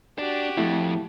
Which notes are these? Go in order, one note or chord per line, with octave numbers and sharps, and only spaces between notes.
D4 F#4 G4
F2 A3 E4